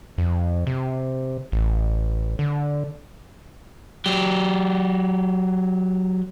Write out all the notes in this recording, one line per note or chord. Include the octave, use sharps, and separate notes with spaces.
F2
C3
A1
D3
F#3 G4